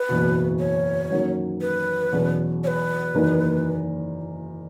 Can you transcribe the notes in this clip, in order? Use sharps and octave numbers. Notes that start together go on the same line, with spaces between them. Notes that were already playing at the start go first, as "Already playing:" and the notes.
Already playing: B4
F#1 E2 B2
C#5
F#2 D#3 F#3 A#3 C#4
B4
E2 B2 F#3 C#4 G#4
C#5
B4
F#1 E2 D#3 A#3 D#4